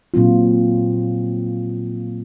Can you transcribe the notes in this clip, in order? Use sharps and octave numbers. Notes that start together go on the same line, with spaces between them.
A#2 F#3 C4 F4